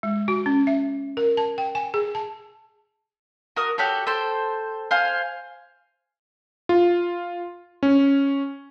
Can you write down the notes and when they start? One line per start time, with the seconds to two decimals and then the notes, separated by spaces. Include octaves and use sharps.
0.03 G#3
0.28 F#4
0.46 C#4
0.67 E5
1.17 A#4
1.37 A5
1.58 G5
1.75 G#5
1.94 G#4
2.15 A5
3.56 F#4 A#4 D#6
3.78 F#4 G4 A4 C#5
4.07 A4 C5 G5
4.91 C5 F5 G#5
6.69 F4
7.83 C#4